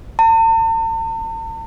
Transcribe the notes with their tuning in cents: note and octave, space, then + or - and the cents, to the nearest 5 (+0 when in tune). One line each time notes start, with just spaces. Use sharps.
A5 +45